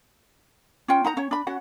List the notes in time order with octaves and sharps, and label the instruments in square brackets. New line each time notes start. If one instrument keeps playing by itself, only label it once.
[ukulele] C#4 F4 G5
D#4 F#5 A#5
C#4 C#5
D4 B5
C#4 F#4 F#5